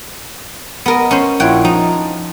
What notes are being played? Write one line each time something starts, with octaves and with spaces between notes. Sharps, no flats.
B3 A#4 D#5
C#4 C5
A#1 E4 F4 C#5 F#5 G5
F3 D#4